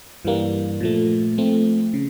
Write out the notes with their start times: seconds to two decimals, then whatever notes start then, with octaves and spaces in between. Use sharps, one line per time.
0.25 G2 E3 G3 A#3
0.80 A#2 F3 A3
1.38 F3 A3 C4
1.94 C#3